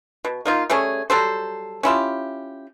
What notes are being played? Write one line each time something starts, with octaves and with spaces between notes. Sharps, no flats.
B2
A#3 D#4 F4
G3 A3 C#4 G#4
F#3 G3 A4 C5
C#4 E4 F4 G4